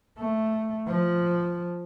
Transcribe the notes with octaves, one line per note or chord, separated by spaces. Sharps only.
A3
F3